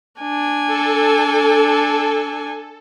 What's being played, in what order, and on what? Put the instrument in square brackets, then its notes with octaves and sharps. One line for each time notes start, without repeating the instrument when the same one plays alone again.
[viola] D4 G#5
[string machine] A4